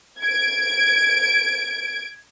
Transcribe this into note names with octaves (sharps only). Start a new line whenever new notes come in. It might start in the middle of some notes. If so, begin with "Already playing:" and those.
G#6 D7